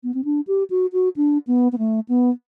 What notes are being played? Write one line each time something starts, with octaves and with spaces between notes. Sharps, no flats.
B3
C4
D4
G4
F#4
F#4
D4
B3
B3
A3
B3